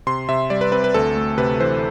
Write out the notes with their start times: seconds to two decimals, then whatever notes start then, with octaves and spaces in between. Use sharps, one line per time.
0.07 C3 C6
0.29 C3 E5
0.50 G3 D5
0.61 B4
0.72 C4 B4
0.84 B4
0.94 D2 A4
1.16 A3
1.38 C3 B4
1.60 E3 C5